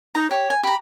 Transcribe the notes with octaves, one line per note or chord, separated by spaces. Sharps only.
D#4 A#5
G4 C#5
G#5
G4 A#5 B5